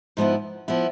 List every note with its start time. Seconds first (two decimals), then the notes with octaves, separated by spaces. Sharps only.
0.17 G#2 F3 B3 E4
0.68 F3 B3 E4